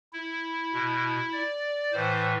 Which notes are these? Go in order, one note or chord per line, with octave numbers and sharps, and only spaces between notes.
E4
B2
D5
A2 E3 C5